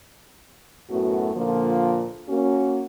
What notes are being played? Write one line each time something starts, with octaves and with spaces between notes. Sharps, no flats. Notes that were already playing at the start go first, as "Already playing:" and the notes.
F#2 A2 A3 B3 F#4
A#2 D3 F3 A#3
A#3 C#4 F#4